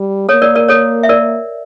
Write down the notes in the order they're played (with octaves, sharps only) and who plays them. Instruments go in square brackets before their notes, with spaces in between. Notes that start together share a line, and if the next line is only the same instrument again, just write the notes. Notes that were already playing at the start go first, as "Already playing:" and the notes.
Already playing: [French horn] G3
[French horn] A#3 [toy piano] A4 C#5
[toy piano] A#4 D5
A#4 D5
A4 C#5
E5
A#4 D5